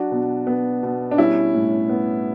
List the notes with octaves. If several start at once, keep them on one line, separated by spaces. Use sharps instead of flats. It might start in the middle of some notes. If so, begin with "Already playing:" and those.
Already playing: F#3 D4 F#4
B2
B3
B2
D4
G3 C#4 E4
A2
B3